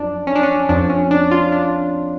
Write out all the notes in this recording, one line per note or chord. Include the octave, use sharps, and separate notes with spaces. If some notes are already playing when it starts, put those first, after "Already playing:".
Already playing: F#2 F3 D4
C#4
D4
C#4
F2 F3 D4
C#4
D4
F4
D4